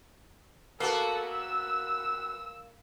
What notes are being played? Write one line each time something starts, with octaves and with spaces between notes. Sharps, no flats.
A#3 B3 F#4 A4
E6